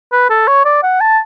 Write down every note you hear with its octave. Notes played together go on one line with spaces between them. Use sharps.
B4
A4
C#5
D5
F#5
A5